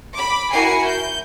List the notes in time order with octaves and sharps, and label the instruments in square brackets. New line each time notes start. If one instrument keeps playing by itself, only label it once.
[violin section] B5 D6
E4 F#4 A#4 G#5 C7 C#7
G6